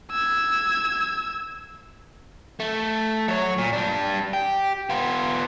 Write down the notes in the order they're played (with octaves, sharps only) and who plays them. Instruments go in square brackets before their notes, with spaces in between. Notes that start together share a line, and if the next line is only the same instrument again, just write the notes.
[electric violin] E6 G#6
[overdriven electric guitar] A3
F#3 C#5
A#2
G3 D4
G4
B3 F4